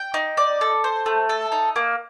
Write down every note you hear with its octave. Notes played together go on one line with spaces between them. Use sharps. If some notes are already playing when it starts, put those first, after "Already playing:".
Already playing: G5
D#4
D5
A4
C5
A3
A4
D#4
A#3